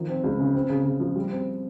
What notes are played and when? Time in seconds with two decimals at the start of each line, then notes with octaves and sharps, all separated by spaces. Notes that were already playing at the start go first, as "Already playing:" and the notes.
Already playing: D#3 F3
0.09 C4
0.24 C#2
0.39 C#3
0.55 C4
0.69 C#3
0.85 C#3
1.00 F3
1.15 G3
1.31 C4